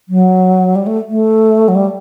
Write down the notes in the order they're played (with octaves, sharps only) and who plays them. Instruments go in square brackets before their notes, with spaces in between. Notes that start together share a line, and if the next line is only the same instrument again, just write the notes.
[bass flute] F#3
G3
A3
A3
F#3
G3